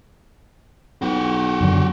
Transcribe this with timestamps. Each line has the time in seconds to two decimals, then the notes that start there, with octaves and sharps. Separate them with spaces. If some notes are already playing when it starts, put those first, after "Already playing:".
1.02 B1 F#4 G4
1.61 F#1 D3 F#3